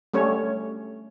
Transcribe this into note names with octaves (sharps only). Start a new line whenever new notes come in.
G3 A3 C#4 C#5